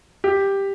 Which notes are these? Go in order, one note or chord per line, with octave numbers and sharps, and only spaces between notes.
G4